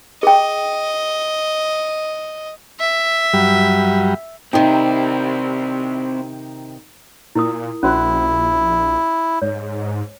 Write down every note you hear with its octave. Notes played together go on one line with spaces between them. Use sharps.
G#4 D#5 G5
E5
G2 F#3 G3
C3 D#3 C4 D#4 E4 G5
A#2 E4 A#4 D#6
A#1 C#4 E4 F#4 C5
G#2 C#5